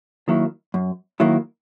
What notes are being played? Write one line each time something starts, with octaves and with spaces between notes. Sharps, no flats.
D#3 F#3 A#3 E4
F#2
D#3 F#3 A#3 E4